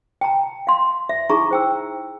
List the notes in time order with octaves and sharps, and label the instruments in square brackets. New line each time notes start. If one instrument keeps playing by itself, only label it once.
[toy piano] G5 A5 A#5
F5 C6
E5
D#4 E4 G#4 A#5 C#6
C5 G5 E6